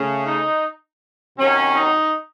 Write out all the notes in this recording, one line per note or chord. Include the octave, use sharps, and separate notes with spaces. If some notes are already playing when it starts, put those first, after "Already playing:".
Already playing: C#3 A3 C#4
D#4
C3 D#3 F#3 C#4
D#4